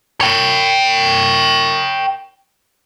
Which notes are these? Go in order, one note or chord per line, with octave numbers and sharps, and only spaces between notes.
C#5 G5